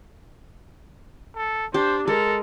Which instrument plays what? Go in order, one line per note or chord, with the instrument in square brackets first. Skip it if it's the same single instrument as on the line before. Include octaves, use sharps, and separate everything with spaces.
[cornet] A4
[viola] D4 [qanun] G4 [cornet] C5
[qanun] G#3 [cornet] A4 [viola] A#4